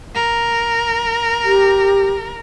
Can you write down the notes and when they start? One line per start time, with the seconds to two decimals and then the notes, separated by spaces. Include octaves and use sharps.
0.14 A#4
1.44 G4